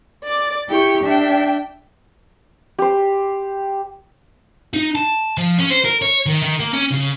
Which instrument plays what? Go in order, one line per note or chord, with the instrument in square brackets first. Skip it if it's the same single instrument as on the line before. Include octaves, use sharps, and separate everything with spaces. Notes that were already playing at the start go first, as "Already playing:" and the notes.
[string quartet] D5 D6
E4 G4 G5 C#6
D4 E5 G5
[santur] G4 C5
[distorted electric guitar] D#4
A5
F3
C#4
C5
A#4
C#5
D#3
D#3
A#3
C#4
C#3